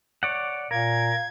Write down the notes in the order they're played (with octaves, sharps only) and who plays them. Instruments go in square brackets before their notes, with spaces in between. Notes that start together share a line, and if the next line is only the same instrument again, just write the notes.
[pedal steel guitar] C#5 D5 F#5
[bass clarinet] A#2 [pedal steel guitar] A#4 [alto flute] F5 [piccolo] G#6